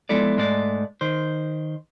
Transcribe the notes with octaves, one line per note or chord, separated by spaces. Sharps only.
F3 G#3 B3 E4 A4 D5
G#2 G#3 A3 D5
D#3 C5